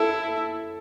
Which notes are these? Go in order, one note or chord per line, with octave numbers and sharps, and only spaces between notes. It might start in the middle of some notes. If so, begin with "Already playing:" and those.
Already playing: E4 A4